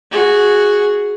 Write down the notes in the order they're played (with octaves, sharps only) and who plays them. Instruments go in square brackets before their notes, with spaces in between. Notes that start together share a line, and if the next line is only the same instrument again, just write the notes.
[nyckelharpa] F#4 G#4